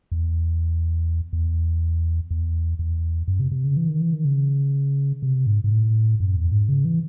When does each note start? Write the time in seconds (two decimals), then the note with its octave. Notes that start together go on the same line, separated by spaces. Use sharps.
0.12 E2
1.33 E2
2.31 E2
2.79 E2
3.28 F#2
3.40 C3
3.52 C3
3.64 C#3
3.77 E3
3.88 D#3
4.01 E3
4.13 D#3
4.25 C#3
5.23 C3
5.47 G#2
5.64 G#2
5.71 A2
6.20 F#2
6.36 E2
6.52 G#2
6.69 C#3
6.85 E3